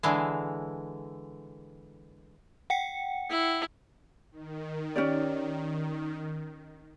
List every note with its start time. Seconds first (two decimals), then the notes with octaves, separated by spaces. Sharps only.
0.03 D3 E3 G#3
2.70 F#5 G5 C#7
3.30 E4
4.31 D#3
4.96 C#4 G4 D5